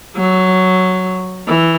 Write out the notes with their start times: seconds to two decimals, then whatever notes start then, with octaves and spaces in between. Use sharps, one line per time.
0.16 F#3
1.48 E3